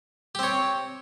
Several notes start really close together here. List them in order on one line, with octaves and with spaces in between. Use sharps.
G4 C4 C#5